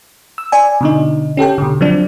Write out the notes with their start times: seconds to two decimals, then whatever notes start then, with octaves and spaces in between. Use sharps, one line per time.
0.38 E6
0.52 D5 G#5
0.81 B2 D3 D#4
1.37 C#4 G4 A4 G5
1.58 B2 D3
1.81 F3 F#3 C4 D4